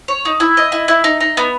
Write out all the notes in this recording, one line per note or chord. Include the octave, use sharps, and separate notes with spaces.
C#5
D#4
E4
D#5
E4
E4
D#4
D#4
B3